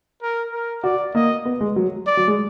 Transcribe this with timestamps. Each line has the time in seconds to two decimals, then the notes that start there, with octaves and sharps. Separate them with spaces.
0.22 A#4
0.53 A#4
0.83 F#4 D5
1.15 A#3 D#5
1.45 B3
1.61 G#3
1.76 F#3
2.07 D5
2.17 F#3
2.28 G#3